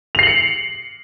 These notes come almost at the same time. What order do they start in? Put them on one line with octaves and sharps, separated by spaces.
F7 C7 F#7 C#7